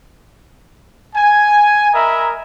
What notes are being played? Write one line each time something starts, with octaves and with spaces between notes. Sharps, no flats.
G#5
A#4 D#5 E5 A#5 B5